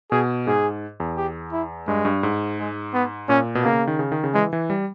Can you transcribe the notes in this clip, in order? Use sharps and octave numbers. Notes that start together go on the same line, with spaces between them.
B2 G#4
G#2 G#4
E2
G4
E4
G2 G#3
G2
G#2
G#3
B3
A#2 C#4
B2
C#3 A#3
D#3
C#3
D#3
C#3
E3 G#3
E3
G3